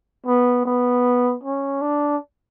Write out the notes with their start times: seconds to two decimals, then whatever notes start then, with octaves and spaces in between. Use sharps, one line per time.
0.26 B3
0.66 B3
1.44 C#4
1.82 D4